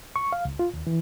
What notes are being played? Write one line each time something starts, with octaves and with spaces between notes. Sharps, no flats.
C#6
F5
C#2
F4
D#2
E3